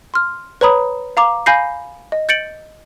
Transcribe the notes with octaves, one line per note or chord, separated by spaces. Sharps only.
C6 F6
B4 C#5 A#5 B5 D#6
F5 A#5 D6
F5 G#5 B5 G6 A#6 C7
D#5
G6 A6 C#7 D7 F#7